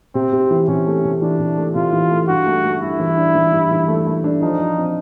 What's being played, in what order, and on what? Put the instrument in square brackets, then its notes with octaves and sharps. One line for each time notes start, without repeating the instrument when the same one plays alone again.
[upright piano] C3 [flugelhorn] C4
[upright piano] C3
E3
[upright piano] C3 [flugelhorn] C#4
[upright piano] A3
C3
[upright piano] E3 [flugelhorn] D4
[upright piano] C3
A3
[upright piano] C3 [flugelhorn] F4
[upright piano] E3
A3
[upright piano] G2 [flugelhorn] F#4
[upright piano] A3
A3
[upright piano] G2 [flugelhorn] E4
[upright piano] E3
D4
E3
G2
E3
A3
A3
D4
[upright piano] F3 [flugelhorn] D#4
[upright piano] F3
C4